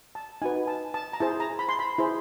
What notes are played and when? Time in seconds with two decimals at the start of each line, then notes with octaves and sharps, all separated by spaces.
0.15 A5
0.42 D#4 F#4 B4 G#5
0.67 A5
0.94 A5
1.13 A#5
1.20 E4 G#4 C5 A5
1.40 A#5
1.59 B5
1.69 C6
1.79 B5
1.98 E4 G#4 C5